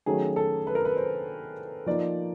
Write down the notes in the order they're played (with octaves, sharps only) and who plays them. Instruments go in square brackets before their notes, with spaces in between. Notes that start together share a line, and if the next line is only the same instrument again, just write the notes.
[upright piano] D#3 F#3 A3 C#4 G#4
A4
B4
A#4
B4
C5
F3 A#3 D#4 D5